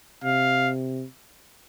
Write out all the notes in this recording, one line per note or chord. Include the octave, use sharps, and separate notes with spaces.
C3 F5